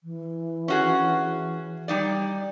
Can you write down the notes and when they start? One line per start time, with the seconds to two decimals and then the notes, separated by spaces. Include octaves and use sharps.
0.04 E3
0.68 C#4 F#4 G#4
1.88 G3 D#4 D5